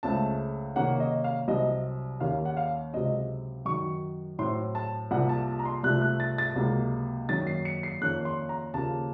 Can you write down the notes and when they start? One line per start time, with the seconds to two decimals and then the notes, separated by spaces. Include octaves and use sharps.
0.03 C#2 C#3 A3 C4 A5
0.75 C3 D#3 A#3 C#4 F#5
1.00 D#5
1.24 F5
1.48 C2 C3 F#3 C4 D#5
2.20 D#2 D#3 A#3 C#4 F5
2.45 F#5
2.57 F5
2.93 C#2 C3 F#3 C4 D#5
3.65 F#2 D#3 F#3 C#6
4.39 A2 F#3 C4 C6
4.75 A5
5.11 C2 C3 F3 A#3 F#5
5.29 A5
5.48 A5
5.59 A#5
5.65 C6
5.84 C2 C3 F3 A3 C4 F#6
6.02 F#6
6.20 A6
6.38 A6
6.56 C#2 C3 F#3 A#3
7.29 F#2 D#3 A#3 C#4 A6
7.47 C7
7.65 C#7
7.83 C7
8.02 F2 D#3 A#3 C#4 F#6
8.25 C6
8.49 A#5
8.74 D#2 C#3 F3 A#3 A5